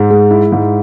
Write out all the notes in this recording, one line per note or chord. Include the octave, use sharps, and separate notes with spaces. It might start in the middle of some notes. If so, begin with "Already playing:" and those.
Already playing: G#2
G#3
E4
G#2